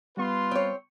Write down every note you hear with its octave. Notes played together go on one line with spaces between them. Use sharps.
G3 B3 F4 B4 C6
C4 C#5